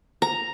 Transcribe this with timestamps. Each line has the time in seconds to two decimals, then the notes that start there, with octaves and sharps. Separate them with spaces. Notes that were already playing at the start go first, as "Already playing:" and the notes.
0.22 A#5